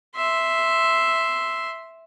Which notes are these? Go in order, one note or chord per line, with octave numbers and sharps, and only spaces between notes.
E5 C6